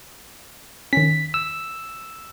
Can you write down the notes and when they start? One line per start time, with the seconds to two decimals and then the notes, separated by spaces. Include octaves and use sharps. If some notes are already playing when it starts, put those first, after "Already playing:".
0.93 D#3 C#4 B6
1.34 E6